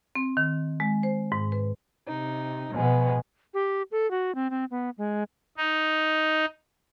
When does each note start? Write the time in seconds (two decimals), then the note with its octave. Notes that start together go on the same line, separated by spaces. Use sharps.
0.15 C4
0.37 D#3
0.80 G#3
1.03 C5
1.32 G#2
1.52 B4
2.07 C3 D#4
2.74 B2 F3 G#3 B3
3.54 G4
3.92 A4
4.11 F#4
4.35 C4
4.50 C4
4.71 B3
4.98 G#3
5.57 D#4